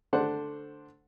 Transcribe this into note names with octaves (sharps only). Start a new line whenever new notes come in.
D3 A3 D4 C5 F#5